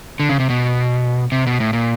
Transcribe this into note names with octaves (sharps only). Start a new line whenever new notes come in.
D3
C#3
C3
B2
C3
B2
A2
A#2